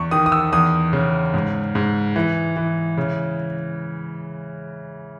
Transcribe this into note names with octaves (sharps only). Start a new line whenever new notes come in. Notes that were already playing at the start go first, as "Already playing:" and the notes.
Already playing: E2 C#6
D#3 D#6
D#6
E6
E2 D#6
C#3
G#2
G#2
E3
E3
C#3